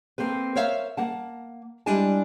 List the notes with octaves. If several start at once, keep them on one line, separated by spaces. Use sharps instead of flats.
A#3 C4 A4 B4
A#4 C5 C#5 E5 F5
A#3 F#5 A5
G3 G#3 D4 E4 G#5 A5